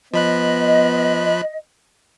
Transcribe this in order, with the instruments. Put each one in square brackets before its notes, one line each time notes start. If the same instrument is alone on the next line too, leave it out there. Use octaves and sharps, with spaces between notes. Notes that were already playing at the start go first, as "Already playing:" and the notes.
[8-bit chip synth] F3 B5 F#6 [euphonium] B3 [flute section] D#5